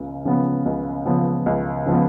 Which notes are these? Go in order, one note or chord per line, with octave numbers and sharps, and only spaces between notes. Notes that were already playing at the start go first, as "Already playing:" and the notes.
Already playing: C#2 C#3
C#3 F3 B3
C#2
C#3 F3 B3
C#2
C#3 F3 B3